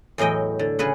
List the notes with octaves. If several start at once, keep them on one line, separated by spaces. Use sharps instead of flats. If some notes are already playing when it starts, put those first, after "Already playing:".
E2 A2 F#3 D#5 G5
D3
C#3 G#4 B4 F#5